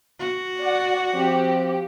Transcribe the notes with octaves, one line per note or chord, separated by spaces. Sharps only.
F#4
D5 F#5
F3 C4 G4